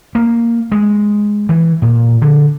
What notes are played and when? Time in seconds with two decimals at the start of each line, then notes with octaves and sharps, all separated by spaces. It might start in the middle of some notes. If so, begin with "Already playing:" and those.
0.15 A#3
0.72 G#3
1.49 E3
1.82 A#2
2.22 D3